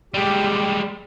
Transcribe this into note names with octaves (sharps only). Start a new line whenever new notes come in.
G3 G#3 G4